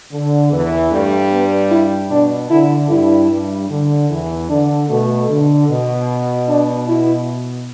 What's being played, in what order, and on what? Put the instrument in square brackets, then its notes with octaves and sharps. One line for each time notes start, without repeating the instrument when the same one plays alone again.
[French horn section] D3
[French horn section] E2 E3 [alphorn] B3
[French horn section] G2 G3 [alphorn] A3
[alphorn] B3
E4
[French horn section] B2 [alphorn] D4
[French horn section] D3 [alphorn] E4
[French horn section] G2 G3 [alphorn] E4
[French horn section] G2 G3
D3
E2 E3
[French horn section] D3 [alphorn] D4
[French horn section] B2 [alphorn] A3
[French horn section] D3
B2
[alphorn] D4
E4